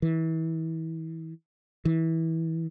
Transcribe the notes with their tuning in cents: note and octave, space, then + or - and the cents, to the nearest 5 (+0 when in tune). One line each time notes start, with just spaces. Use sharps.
E3 -30
E3 -20